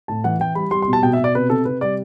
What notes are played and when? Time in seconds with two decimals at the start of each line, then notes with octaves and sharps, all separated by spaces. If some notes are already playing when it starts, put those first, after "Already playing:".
0.08 A2 A5
0.24 E3 F#5
0.40 E3 G5
0.55 G3 B5
0.71 G3 C6
0.82 C6
0.88 B2
0.93 A5
1.02 B2 G5
1.13 E5
1.19 B2 D5
1.35 C3 B4
1.50 C3 A4
1.65 C3 B4
1.81 G3 D5